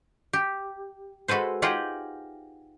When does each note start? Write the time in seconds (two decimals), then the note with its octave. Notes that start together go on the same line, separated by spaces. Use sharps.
0.33 G4
1.28 G#3 F#4 A4 B4 C5
1.62 D#4 F4 G4 G#4 F#5 G5